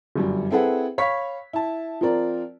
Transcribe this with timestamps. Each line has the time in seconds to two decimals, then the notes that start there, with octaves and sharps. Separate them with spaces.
0.16 G1 F#2 G3
0.51 C4 E4 G#4 A4 B4 F#5
0.98 C#5 F5 B5 C#6 B6
1.53 E4 A5
2.01 F3 C4 F4 A#4 D5